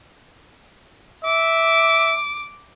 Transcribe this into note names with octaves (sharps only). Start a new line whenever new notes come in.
E5 D6